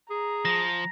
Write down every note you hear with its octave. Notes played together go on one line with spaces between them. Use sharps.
G#4 A#5
F3 A#6